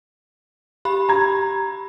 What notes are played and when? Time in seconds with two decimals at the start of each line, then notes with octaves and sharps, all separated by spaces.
0.85 G4 B5
1.09 A#5 G#6